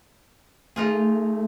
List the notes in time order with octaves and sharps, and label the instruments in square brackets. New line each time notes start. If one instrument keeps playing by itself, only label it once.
[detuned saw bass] A3 [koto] D#4 F4 G#4